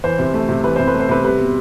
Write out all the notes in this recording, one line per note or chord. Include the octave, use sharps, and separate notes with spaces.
E3 C5
C3
A3
C3
E3 B4
C3 C5
B4
A3
C5
C3 B4
G3 B4
B2